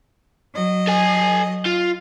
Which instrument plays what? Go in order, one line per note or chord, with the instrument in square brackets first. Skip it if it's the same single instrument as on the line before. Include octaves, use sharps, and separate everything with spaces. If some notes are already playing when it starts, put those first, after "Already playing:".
[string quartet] F#3 D#5
[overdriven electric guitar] A4 G#5
F4